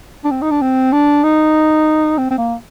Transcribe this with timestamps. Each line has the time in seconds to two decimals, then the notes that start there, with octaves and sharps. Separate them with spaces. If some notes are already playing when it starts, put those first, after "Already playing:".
0.24 D4
0.31 C4
0.42 D#4
0.51 D4
0.62 C4
0.93 D4
1.24 D#4
2.18 C4
2.31 C4
2.38 A#3